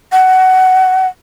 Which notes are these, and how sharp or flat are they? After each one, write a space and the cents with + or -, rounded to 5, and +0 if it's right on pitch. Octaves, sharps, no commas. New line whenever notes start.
F#5 +20